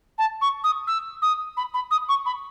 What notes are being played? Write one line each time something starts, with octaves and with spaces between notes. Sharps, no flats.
A5
C#6
D#6
E6
D#6
B5
B5
D#6
C#6
B5